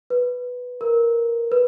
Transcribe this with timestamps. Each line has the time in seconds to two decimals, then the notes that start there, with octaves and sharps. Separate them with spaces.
0.10 B4
0.81 A#4
1.52 B4